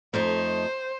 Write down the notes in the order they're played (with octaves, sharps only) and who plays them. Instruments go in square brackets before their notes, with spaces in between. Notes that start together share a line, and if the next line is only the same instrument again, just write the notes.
[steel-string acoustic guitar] F2 A3 D#4 [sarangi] C5